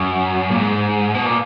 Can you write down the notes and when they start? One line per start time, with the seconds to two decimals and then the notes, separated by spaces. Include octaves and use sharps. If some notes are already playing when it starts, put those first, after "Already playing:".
Already playing: F#2
0.51 A#2
0.58 G#2
1.15 B2
1.25 A#2